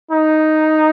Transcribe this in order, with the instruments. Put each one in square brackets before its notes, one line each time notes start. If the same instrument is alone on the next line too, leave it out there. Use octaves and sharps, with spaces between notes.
[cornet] D#4